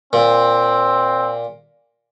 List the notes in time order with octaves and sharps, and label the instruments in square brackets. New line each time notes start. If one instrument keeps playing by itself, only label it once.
[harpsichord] A#2 [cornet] C4